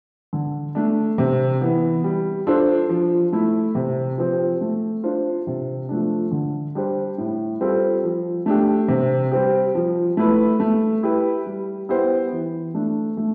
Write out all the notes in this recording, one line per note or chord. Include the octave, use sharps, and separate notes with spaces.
D3
A3 D4
C3
E3 B3
G3
D4 F4 A4 C5
F3
A3 E4
C3
F3 C4 G4
A3
D4 F4 C5
C3
F3 A3 D4
D3
G3 D4 G4 C5
A2
G3 C4 F4 A4
F3
A3 D4 G4
C3
G3 C4 G4
F3
A3 E4 B4
A3
E4 G4 B4
G3
B3 E4 G4 C5
E3
A3 D4
A3